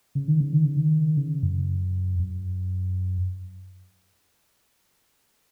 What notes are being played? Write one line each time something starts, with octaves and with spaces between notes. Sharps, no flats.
C#3
D#3
C#3
D#3
C#3
D#3
C#3
F#2
F#2